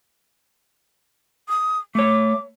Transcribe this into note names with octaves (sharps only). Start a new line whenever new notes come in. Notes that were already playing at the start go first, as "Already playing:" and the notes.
D#6
A3 C#5 D6